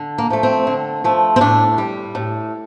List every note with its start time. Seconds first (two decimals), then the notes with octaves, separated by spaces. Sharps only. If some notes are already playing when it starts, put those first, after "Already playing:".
Already playing: D3
0.18 A#3
0.30 F3 A3
0.43 C4
0.67 D3
1.04 F3 A3
1.36 C4
1.41 A2 D4
1.78 G3
2.15 A2